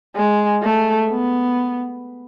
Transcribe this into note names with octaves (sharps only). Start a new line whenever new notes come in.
G#3
A3
B3